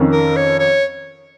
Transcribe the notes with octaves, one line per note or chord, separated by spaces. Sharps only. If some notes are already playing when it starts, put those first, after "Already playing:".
Already playing: F2 D#3 C#4
A#4
C#5
C#5